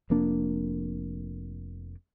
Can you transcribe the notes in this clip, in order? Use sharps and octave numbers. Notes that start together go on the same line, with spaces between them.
F1 F2 A#3 D4